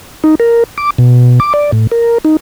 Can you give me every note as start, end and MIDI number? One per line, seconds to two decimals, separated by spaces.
0.24 0.35 63
0.40 0.64 70
0.78 0.90 86
0.98 1.40 47
1.40 1.53 86
1.54 1.71 74
1.72 1.87 45
1.92 2.18 70
2.25 2.37 63